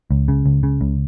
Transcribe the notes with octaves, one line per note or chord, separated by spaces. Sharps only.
C#2
C#3
C#2
C#3
C#2